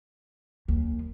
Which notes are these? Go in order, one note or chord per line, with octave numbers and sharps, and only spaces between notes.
D#2